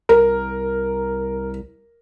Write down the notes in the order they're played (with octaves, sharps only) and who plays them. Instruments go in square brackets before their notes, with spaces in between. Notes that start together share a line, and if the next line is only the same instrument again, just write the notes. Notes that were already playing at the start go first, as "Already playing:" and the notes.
[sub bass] C2 [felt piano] A#4